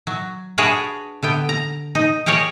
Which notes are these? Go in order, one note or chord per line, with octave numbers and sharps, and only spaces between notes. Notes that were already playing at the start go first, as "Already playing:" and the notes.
F#3
D4 F#4 G#4 B4 C#5
D3 B3 G5
A#5
D#4
G4 G#4 A#4 C#5 D5